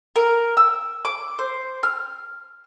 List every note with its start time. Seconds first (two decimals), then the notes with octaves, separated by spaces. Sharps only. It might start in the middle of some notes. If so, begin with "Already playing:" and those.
0.16 A#4
0.57 E6
1.05 D6
1.39 C5
1.83 F6